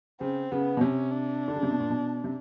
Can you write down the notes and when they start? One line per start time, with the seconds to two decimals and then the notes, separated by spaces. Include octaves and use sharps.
0.21 C#3 C4
0.52 C#3 B3
0.77 B2
0.81 C3 C#4
1.11 D4
1.48 D3
1.56 C#3
1.63 C3
1.71 B2
1.80 A#2
1.90 B2
2.24 C3